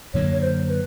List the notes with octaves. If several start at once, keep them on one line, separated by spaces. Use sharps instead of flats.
F#2 D3 F#3 A#3 C#5
C#5
C5
B4